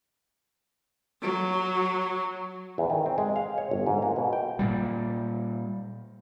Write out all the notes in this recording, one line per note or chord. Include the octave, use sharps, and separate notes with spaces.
F#3
E2
D#3
C4
G#3
F5
C#5
G1
G#2
A#3
B2
G5
A#2 G3